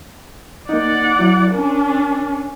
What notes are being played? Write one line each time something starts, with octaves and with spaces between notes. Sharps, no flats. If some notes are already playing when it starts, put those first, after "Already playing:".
A#3 D#4 D5 F#5
F#3 E4
C#4 D4 A#4